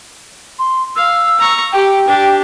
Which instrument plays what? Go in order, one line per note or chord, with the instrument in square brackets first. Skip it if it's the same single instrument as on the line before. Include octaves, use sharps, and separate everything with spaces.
[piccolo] C6
[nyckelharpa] F5 [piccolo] E6
[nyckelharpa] A#5 C#6
[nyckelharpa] G4 [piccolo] G5
[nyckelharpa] D4 G4